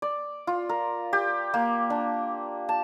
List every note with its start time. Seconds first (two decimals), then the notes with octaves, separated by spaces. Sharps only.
0.02 D5
0.47 F4
0.69 A#4
1.13 G4
1.54 A#3
1.90 D4
2.69 A5